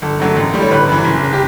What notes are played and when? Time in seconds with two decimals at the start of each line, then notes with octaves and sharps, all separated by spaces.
0.02 G1 A4
0.20 F#2 D3 F#3 A3
0.36 A1
0.54 A2 G3
0.61 C#5
0.71 G1 B4
0.88 F#2 E3
1.05 F#1
1.23 C#3
1.33 G4